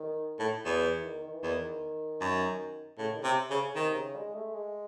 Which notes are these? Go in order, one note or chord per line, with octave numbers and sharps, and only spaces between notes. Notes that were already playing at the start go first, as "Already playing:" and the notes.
Already playing: D#3
A2
E2 F#3
E3
D#3
D#3
E3
E2 D#3
F#2
A2 C#3
D#3
C#3
C3
C3
C#3
C#3
C3 D#3
C#3
G#3
A3
G#3